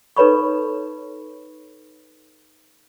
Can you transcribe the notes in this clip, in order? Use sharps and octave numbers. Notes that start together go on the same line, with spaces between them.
D#4 A4 B4 C#5 B5 C#6